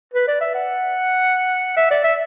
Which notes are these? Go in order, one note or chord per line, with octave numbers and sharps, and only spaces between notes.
B4
D5
E5
F#5
E5
D5
E5